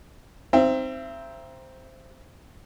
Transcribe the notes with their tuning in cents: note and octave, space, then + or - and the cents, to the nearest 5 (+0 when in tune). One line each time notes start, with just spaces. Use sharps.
C4 +0 D#4 +10 E5 +35